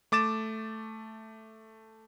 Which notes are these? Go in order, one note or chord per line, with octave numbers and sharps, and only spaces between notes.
A3 D6 A6 E7